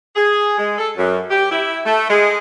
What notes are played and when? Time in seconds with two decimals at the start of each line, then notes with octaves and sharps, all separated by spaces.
0.15 G#4
0.57 G#3
0.78 A4
0.96 F#2
1.31 G4
1.50 E4
1.84 A3
2.08 G#3